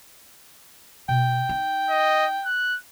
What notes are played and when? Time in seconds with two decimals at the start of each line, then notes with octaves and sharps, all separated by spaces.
1.09 B2 G5
1.49 D#4
1.90 D#5
2.45 F#6